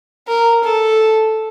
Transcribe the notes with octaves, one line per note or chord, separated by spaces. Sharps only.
A#4
A4